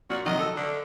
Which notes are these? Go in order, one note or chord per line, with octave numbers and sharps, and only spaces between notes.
A#2 F#4
C3 D#3 F#3 D#5
A4 E6
D3